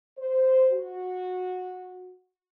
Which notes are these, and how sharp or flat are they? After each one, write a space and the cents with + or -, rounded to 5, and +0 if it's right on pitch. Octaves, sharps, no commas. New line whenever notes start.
C5 -10
F#4 -15